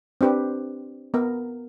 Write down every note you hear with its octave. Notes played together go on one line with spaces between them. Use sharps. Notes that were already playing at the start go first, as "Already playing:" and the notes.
C4 D4 G4 B4 C5
B3 A#4